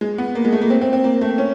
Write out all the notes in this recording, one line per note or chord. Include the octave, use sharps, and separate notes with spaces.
G#3
B3
A#3
G#3
A3
A#3
C4
C4
C4
A#3
A3
C#4